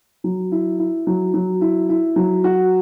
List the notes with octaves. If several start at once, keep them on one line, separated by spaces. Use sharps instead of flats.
F#3
E4
E4
F#3
F#3
E4
E4
F#3
F#4